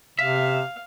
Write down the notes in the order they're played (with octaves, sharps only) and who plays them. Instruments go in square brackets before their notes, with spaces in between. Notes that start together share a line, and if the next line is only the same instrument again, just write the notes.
[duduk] C3 [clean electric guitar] E5 [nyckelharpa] F5